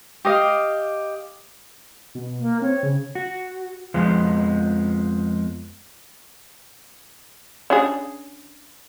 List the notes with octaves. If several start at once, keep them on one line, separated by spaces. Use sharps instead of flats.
G4 D#5 F5
B2
A#3
C4 C#5
C#3
F#4
F2 F3 G#3 B3 F4
C#4 D4 G#4